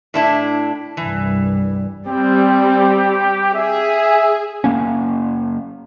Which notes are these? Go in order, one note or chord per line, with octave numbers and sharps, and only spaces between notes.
A2 D4 E4
C2 G2 E3
G3 C4 G4
G#4 E5
F#1 A2 A#3 C#4